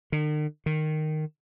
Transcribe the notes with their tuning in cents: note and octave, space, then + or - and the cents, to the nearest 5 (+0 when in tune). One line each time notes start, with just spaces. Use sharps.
D#3 -45
D#3 -10